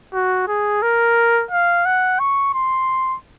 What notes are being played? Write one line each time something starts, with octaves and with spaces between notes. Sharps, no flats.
F#4
G#4
A#4
F5
F#5
C#6
C6